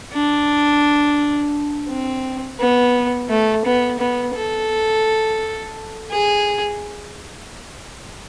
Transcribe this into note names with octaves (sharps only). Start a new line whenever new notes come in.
D4
C4
B3
A3
B3
B3
A4
G#4